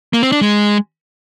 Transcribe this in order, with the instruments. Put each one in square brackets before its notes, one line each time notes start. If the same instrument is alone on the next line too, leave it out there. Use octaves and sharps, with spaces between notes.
[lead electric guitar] A#3
C4
D4
G#3